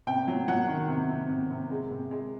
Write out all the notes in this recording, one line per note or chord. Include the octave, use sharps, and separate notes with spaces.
C3 G5
F#3
F#3 F#5
D#3
C3
C3
C3
C3
G#3
C3
G#3